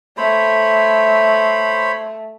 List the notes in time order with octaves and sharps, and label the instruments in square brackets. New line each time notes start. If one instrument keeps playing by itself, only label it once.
[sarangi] A3 [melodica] C5 C#5 B5